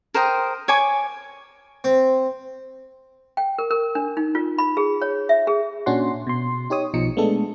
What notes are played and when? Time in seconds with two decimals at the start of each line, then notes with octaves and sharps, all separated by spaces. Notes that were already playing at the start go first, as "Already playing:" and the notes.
0.14 A#4 C5 G5 D#6
0.68 C#5 G#5 D6
1.84 C4
3.37 G5
3.58 A#4
3.71 A#4
3.95 D4
4.17 D#4
4.35 F4
4.58 B5
4.77 G#4
5.02 C#5
5.29 E5
5.47 G#4
5.86 A#2 C#4 D4 F#4 F#5 C6
6.27 B2 C6
6.70 D#4 G4 C#5 D#6
6.94 B1 B2 F3 D#4 C#7
7.17 G#3 A3 B3 D4 A4